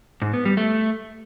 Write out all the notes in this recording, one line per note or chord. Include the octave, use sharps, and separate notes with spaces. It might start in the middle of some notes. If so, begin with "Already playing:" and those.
G#2
B3
G3
A3